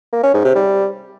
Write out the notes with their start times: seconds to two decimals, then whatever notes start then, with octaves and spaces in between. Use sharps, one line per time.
0.13 A#3
0.24 C#4
0.34 G#2
0.45 C3
0.55 G3